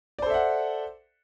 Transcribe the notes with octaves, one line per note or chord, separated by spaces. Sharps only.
A4 C5 D5 E5 F#5